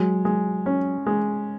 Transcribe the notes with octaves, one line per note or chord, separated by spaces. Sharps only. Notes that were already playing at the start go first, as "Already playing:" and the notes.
Already playing: F#3 G#3
G#3
C#4
G#3